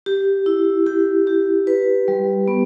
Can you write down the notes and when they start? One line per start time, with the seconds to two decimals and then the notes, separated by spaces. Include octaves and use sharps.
0.06 G4
0.46 E4
0.86 G4
1.27 G4
1.67 B4
2.08 G3
2.48 B3